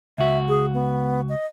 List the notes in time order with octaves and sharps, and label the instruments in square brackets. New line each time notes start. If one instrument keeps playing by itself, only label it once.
[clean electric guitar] C#2 F#4 [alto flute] E5
[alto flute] G#4
B3
D#5